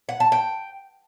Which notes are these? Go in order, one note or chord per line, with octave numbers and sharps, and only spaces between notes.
F#5
A5
G5